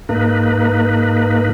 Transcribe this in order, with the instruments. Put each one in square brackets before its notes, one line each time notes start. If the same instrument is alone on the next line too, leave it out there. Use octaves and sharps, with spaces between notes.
[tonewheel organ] G#2 A#3 D#4 B4